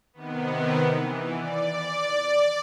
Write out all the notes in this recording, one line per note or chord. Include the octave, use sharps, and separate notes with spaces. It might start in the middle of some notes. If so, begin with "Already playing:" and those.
C3 D#3 B3
E3
D5